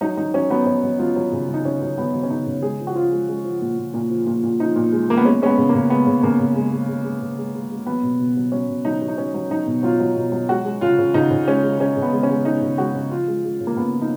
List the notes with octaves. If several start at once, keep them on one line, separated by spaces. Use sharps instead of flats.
F#3 D#4
F#3 D#4
F#3 C#4
F#3 B3
F#3 C#4
F#3
F#3 F4
F#3
C#3
F#3
D#4
F#3 C#4
F#3
F#3 B3
F#3
C#4
C#3 D#4
C#3
G#3 G#4
F3
F#4
F3 F4
G#3
G#3
F3
A#2
A#2
A#2
F3
A#2
A#2
F3 D#4
A#2
G#3
G#3 A#3
B3
G#3 C#4
G#3 B3 C#4
C#3
A#3
C#3
G#3 B3
C#3
C#3 A#3
C#3
G#3
G#3
G#3
G#3
C#3
G#3
G#3
G#3
F#3 B3
B2
B2
F#3
F#3 C#4
B2
F#3 D#4
F#3
D#4
F#3 C#4
F#3
F#3 D#4
B2
F#3 F4
F#3
B2
F#3
G#3 F#4
G#3
C#3 F4
C#3
C#3 D#4
C#3
G#3 C#4
G#3
G#3 C#4
C#3
B3
G#3
C#4
G#3
G#3 D#4
C#3
G#3 F#4
C#3
F3 F4
G#3
G#3
C#3
A#3
C#3 B3
F3
D#4